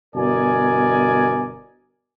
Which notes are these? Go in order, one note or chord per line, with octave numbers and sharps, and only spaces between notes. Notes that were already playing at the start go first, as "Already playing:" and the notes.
G1 B2 A#4 D5 D#5 G#5